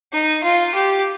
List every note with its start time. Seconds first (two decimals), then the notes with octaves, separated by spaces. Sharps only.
0.13 D#4
0.43 F4
0.75 G4